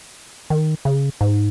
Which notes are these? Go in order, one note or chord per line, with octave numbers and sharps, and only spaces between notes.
D#3
C#3
G#2